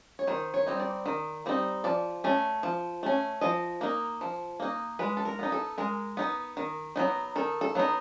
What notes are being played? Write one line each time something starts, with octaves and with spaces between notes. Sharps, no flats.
C#5
D#3 C5
C#5
G3 C4 D#4
D5
D#3
G3 C4 D#4
F3 D5
A3 C#4
F3
A3 C#4
F3 D#5
A#3 D#4
F3
A#3 D#4
G#3 B4
A4
A#4
B3 D#4
A4
G#3 A#4
B3 D#4
D#3
F#3 B3 D#4
D#3 A4
A4
F#3 B3 D#4